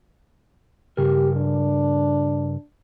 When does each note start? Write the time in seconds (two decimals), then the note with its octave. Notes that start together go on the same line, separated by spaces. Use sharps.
0.97 G2 C#3 G4 A#4
1.37 D4